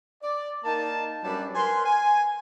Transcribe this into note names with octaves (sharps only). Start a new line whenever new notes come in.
D5
A#3 D#4 A#4 A5
F#2 F#3 G3 D4 B4 A5
A#4 B4 G#5 C6
G#5